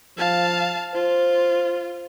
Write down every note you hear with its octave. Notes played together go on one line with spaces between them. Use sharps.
F3 F5 A5
F4 C5